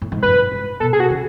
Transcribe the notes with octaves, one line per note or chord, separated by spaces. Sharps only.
A2
G#2
F#2 B4
G#2
B2 A4
G#4
F#4
C#3